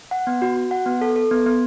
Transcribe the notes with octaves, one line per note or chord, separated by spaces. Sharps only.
F#5
B3
F#4
F#4
F#5
B3
A4
A4
B3
B3